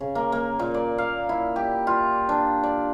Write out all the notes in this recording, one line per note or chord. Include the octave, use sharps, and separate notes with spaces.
C#3
A#3
A#3
A#2
D5
F5
E4
G4
F4
D4
D5